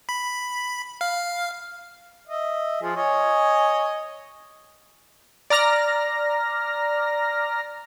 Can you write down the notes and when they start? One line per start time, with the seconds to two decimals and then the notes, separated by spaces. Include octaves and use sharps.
0.09 B5
1.01 F5
2.28 D#5 E5
2.82 F3 G#4
2.96 C#5 D#5 G#5
5.50 D5 A#5 F6 A#6